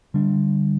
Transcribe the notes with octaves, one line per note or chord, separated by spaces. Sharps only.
D3 G3 D4